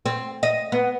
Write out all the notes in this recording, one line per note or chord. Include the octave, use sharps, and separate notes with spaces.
C4
D#5
B3